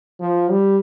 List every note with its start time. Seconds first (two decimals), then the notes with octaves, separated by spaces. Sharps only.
0.21 F3
0.51 G3